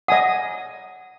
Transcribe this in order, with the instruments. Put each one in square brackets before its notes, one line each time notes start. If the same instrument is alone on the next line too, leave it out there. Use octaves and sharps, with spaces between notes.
[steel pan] D#5 G#5 D#6 [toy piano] F#5